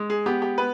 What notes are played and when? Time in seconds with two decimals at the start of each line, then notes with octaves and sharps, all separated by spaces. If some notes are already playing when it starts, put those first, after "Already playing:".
Already playing: G#3
0.10 G#4
0.26 B3 G4
0.42 G4
0.58 B3 B4